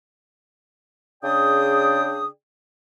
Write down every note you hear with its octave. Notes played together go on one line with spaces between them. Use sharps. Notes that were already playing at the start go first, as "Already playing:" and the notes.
C#3 D4 G#4 D5 G5 D#6